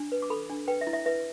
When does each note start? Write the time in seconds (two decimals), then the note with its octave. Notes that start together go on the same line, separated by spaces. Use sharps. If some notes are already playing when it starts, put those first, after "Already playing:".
Already playing: D4
0.12 B4
0.22 D6
0.30 A4 B5
0.50 D4
0.68 B4 G5
0.81 E5
0.87 E4
0.93 E5
1.06 B4 E5